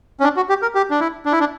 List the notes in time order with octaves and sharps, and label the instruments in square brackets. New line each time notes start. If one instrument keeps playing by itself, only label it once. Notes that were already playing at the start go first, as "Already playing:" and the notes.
[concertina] C#4
D4
F#4
G4
A#4
G4
D4
E4
D4
E4
D4